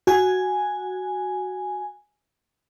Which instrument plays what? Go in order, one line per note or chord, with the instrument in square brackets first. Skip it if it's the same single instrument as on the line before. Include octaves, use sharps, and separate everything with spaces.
[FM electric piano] F#4 G#5